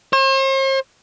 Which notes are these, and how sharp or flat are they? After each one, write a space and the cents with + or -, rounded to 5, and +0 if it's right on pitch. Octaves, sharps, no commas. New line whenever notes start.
C5 +45